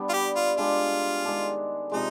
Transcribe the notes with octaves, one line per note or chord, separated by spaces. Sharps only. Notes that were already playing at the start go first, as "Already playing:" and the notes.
Already playing: G3 B3 D4
F4
G4
F4
G#3 D4 F4 G4
D#3 G#3 D4
C3 F3 G#3 D#4